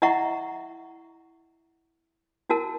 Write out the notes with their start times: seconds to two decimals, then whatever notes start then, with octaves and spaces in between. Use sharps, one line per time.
0.02 E4 D#5 E5 F#5 A#5 C#6
2.49 E4 F#4 A#4 A5